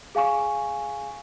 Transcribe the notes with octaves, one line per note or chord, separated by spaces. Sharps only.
G#4 F5 G#5 C#6